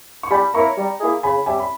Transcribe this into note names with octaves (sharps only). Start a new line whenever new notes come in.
C#6
G3 G#5 B5
A#3 E4 A#4 C#5 A#5 C#6
G3
A#3 E4 G#4
C#3 G#5 B5
G3 C#4 G4 E5 G#5
B5